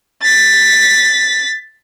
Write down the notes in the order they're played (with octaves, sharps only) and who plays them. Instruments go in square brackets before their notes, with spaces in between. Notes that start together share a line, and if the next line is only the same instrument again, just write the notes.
[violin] A6 B6